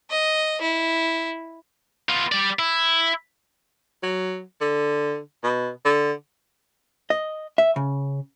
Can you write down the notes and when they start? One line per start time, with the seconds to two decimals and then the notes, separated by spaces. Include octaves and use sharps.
0.10 D#5
0.61 E4
2.09 B3 F4
2.32 G3 D5
2.59 E4
4.03 F#3
4.61 D3
5.44 B2
5.85 D3
7.10 D#5
7.58 E5
7.76 C#3